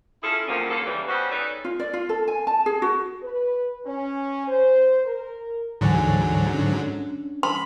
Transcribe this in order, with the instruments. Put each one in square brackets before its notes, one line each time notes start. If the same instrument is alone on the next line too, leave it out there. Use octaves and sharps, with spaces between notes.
[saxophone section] C#4 E4 F4 G#4 A4
E2 G2 F3 F#3 A#3 C#4
D#2 C#3 A#3 A4
C#3 E3 G3
G3 B3 C#4 F#4 C5
D#4 G#4 A4 B4 C#5 D5
[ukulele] F4
D5
F4
A4
G#5
A5
G#4
F#4
[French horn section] B4
C#4
C5
A#4
[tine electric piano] D2 E3 G#5 [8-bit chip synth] G#2 D3 F#3
[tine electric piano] C#4 D4
[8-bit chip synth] B5 [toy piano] C6